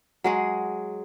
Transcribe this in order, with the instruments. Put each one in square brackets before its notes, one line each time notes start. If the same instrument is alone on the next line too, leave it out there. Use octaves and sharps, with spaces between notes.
[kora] F#3 G#3 G#4